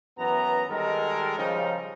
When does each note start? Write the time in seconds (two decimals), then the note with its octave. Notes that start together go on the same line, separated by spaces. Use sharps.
0.19 F#2 E3 B3 A#5
0.69 D#3 G3 G#3 D#4 A4 A#4
1.38 C#3 F3 G3 D#4